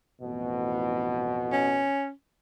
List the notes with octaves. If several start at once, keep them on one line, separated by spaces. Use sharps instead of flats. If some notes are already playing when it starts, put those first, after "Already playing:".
A1 F2 B2
C#4